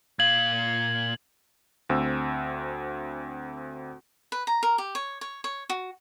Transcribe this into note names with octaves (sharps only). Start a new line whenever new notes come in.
A#2 F5 G#6 F#7
D2 C4 E6
B4
A#5
A#4
G4
C#5
C#5
C#5
F#4